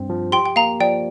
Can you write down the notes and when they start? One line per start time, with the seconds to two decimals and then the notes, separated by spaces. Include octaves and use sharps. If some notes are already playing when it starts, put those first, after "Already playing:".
Already playing: G2 C4
0.09 F3
0.32 G4 G5 C6
0.46 G5
0.56 A#3 F5 A#5
0.80 F3 D5 G5